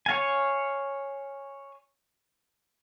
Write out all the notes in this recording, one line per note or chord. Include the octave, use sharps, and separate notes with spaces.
C#5 F5 G#5